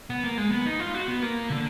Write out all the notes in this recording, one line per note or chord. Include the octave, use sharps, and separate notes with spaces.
B3
A#3
G#3
B3
D#4
F4
F#4
B3
A#3
D3